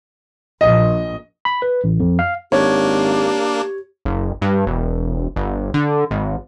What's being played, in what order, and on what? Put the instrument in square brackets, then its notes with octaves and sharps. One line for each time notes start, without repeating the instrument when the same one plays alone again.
[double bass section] A#1 [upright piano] D#5
[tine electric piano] B5
B4
A1
F2
F5
[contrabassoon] G#1 [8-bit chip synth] A#3 D4 [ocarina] G4 [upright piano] C#5
[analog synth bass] F#1
G2
E1
G1
D3
G#1